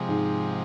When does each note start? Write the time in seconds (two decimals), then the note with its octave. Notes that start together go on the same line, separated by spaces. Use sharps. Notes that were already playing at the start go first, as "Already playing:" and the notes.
Already playing: C3 F3 G#3
0.09 G#2